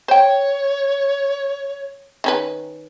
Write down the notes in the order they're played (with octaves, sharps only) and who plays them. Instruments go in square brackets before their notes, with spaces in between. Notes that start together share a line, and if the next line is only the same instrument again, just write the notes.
[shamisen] C5 G5 [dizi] C#5
[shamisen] D#3 C#4 B4